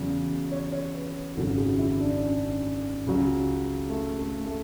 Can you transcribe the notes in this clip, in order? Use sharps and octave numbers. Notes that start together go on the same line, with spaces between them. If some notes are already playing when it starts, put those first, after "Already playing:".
Already playing: E2 C#3 F#3
C#5
C#5
B4
G#1 F#2 C#3 F#3 A4
G#4
E4
D4
C#4
C#2 C#3 F#3
A3
A3
A3